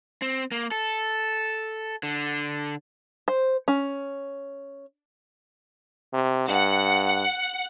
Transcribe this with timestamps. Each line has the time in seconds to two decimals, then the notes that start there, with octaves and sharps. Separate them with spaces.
0.22 C4
0.52 A#3
0.71 A4
2.03 D3
3.28 C5
3.68 C#4
6.13 C3
6.48 G2 F#5